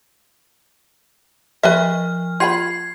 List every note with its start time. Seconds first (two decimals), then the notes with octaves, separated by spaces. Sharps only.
1.63 F3 B4 D#5 E5 F6
2.40 F4 G5 B5 G#6 C7